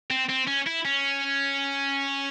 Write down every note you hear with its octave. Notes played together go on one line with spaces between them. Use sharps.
C4
C4
C#4
E4
C#4